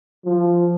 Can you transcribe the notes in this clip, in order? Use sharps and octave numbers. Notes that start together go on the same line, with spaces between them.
F3